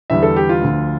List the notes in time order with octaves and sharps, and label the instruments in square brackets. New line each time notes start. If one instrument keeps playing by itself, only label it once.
[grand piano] E2 D3 G3 E5
A4
G4
F4
D2 D3 F3